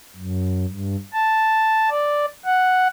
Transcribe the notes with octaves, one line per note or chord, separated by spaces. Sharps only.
F#2
G2
A5
D5
F#5